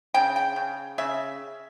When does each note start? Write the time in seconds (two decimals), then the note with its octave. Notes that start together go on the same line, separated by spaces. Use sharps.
0.14 C#3 G5
0.36 G5
0.56 C#3
0.98 C#3 E5